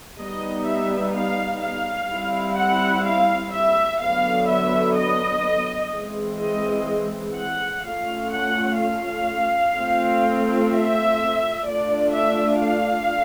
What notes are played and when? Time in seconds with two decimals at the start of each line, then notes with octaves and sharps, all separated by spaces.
0.19 G3 B3 D#4 D#5
0.67 E5
1.15 F5
1.62 F5
2.10 G3 C4 E4
2.58 F#5
3.05 F5
3.53 E5
4.01 D3 F#3 B3 F5
4.49 E5
4.96 D#5
5.92 E3 G#3 C4
6.40 D#5
7.36 F#5
7.84 A3 C#4 F4 F5
8.31 F#5
8.79 F5
9.75 A3 C4 F4
10.70 E5
11.66 A3 D4 F4 D5
12.14 E5
12.61 F5